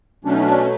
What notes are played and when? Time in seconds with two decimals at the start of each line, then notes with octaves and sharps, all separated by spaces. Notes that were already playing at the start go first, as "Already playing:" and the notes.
0.25 B2 F#3 A3 C#4 D4
0.32 D#4
0.41 D4